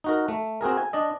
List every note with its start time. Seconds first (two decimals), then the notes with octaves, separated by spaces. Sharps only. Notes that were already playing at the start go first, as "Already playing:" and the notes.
0.04 D#4 F#4 A#4
0.28 A3
0.61 C4 F#4 G#4 A#4
0.77 G#5
0.93 D4 D5 D#5